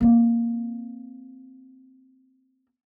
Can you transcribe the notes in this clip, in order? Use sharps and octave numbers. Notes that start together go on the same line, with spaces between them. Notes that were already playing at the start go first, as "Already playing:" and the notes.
A#3 C4